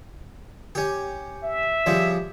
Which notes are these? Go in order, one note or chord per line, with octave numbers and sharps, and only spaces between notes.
C#4 G4
E5
C#3 F3 G3